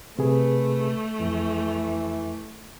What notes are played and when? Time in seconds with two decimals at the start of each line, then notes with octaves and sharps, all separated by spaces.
0.19 C3 A3 G#4 B4
1.20 F2 E3